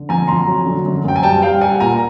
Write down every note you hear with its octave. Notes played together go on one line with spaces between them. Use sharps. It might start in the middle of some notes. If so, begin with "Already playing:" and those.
Already playing: D3
F2 G#5 A#5
F2 A#5 C6
F#3
D3
F#2
F#2 G5
G#5
G3 G5 A5
G3 F5 G5
G3 F#5 G#5
A#2 G#5 A#5